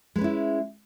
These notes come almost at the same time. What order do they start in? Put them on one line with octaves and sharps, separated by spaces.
G#3 B4 C#4 E4